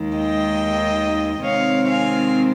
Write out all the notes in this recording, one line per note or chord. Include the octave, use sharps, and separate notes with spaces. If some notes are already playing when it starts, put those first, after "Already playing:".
Already playing: D#2 D#3 G#3
D#5 G5
C3 D#3 G#3 C4 C#5 F5
F5 G#5